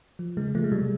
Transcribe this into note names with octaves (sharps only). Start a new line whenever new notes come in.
F3
C#3 G#3
F3 A3
G#3
C3 G3